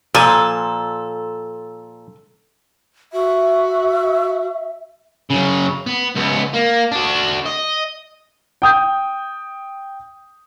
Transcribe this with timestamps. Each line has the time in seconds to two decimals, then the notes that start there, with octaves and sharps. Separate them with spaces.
0.15 A#2 F3 A4 G#5
3.13 F#4 E5
5.31 C#3 F#3
5.86 B3
6.16 C#2 B3
6.54 A#3
6.92 D4 F#4
7.45 D#5
8.62 G5 D#6 G6